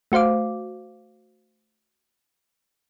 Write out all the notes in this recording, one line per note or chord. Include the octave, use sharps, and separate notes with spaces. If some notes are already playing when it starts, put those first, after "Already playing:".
A3 F#4 C5 F5 D6